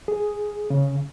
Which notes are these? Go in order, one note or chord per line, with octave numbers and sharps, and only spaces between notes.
G#4
C#3